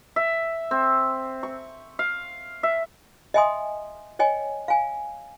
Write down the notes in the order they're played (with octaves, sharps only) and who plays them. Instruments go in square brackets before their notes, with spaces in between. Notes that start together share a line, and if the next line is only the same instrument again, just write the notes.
[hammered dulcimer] E5
C4
C#6
F5
E5
[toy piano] D#5 E5 G5 G#5 C6 D#6
C#5 D#5 G5 G#5
F5 G#5